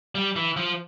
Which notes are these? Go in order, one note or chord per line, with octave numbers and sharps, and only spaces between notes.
G3
E3
F3